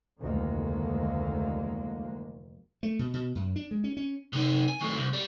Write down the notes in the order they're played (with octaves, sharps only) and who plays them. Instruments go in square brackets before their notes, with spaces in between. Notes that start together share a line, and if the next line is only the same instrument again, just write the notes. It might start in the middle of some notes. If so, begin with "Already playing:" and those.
[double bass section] F1 D2 D#3 G#3 A#3
[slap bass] A3
B2
B2
F#2
D4
G#3
C#4
C#4
[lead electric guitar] C3 D#4
G#5
A2 D#3
C2
G3